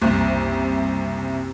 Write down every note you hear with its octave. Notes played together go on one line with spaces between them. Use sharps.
F#1 C2 C3